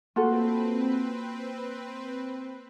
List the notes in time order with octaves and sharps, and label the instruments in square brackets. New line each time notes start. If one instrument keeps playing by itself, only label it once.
[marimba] A#3 [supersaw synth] C4 B4 [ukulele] F4 F#4 A4